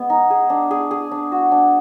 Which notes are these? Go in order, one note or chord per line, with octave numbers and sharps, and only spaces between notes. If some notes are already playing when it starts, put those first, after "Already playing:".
Already playing: G#3 B3 G#4
D#4
G#4
D4
G#4
G#4
D4
F#4
D4